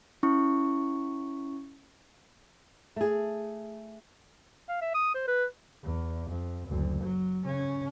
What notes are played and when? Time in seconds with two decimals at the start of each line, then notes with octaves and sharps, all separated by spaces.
0.23 C#4 E4 C#6
2.96 A3 G#4
4.69 F5
4.82 E5
4.95 D#6
5.15 C5
5.27 B4
5.83 E2
6.29 F2
6.68 F#1 D2
7.02 F#3
7.44 C#3 C#4